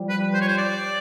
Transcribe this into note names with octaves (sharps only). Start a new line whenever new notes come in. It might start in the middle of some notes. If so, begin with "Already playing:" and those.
Already playing: F3 G3
B4
C5
C#5
C5
D5